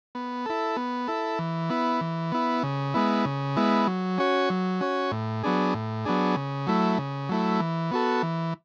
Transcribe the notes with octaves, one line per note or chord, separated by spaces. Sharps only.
B3
E4 A4
B3
E4 A4
E3
B3 E4
E3
B3 E4
C#3
G#3 B3 E4
C#3
G#3 B3 E4
F#3
C#4 F#4 C#5
F#3
C#4 F#4 C#5
A2
F#3 B3 D4 G#4
A2
F#3 B3 D4 G#4
C#3
F#3 A3 E4
C#3
F#3 A3 E4
E3
B3 F#4 A4
E3